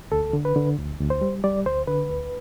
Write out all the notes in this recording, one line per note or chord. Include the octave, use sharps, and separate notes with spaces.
D2 A4
D3
B4
D3
D2
D2
C5
G3
G3 D5
D2 C5
D3 B4
D2